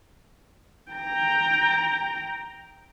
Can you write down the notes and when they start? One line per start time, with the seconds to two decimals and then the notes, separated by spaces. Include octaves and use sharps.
0.92 G5 A#5